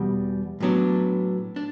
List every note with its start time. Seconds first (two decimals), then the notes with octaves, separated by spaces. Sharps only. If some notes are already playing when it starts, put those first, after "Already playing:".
Already playing: E2 B2 G3
0.60 A2 F#3 B3 D4
1.56 D4